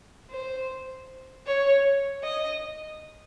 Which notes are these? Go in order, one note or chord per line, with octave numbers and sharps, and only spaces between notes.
C5
C#5
D#5